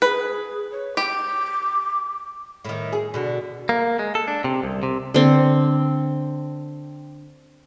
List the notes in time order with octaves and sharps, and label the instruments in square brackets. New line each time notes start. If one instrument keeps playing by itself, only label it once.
[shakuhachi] G#4 [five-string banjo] B4
[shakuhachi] C#5
[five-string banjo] G4 [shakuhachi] D6
[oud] A2 D#3
G#4
B2 D3
[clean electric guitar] A#3
G#3
A4
D4
C3
C2
C3
[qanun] D3 C4